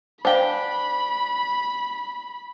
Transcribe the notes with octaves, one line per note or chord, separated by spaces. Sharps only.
D4 C5 F5 G5 G#5 B5